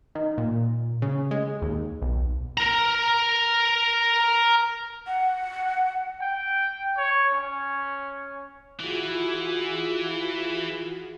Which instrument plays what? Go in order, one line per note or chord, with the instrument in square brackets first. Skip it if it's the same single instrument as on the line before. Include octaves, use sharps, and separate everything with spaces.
[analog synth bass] D#3
A#2
C#3
G#3
D#2
B1
[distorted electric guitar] A#4 A#5
[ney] F#5
[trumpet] G5
C#5
C#4
[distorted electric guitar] E3 [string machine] F4 F#4 G#4